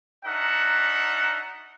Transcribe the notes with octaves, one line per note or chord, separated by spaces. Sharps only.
D4 D#4 F#4 A#4 E5 F#5